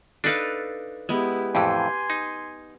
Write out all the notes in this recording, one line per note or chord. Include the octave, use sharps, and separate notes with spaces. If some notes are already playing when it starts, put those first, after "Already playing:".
D4 D#4 A4 B4 F5
G#3 B3 E4 G4
F2 A2 E3 G4 G#5 C6
D#4